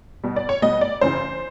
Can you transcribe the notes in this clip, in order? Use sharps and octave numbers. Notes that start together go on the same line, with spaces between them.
B2 G3
D5
C#5
B2 G3 D#5
D5
F#2 C#3 E3 C5